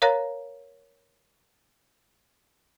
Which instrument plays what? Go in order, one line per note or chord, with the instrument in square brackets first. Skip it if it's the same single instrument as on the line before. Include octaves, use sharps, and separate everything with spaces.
[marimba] A#4 C#5 F5 A#5 F#6 A#6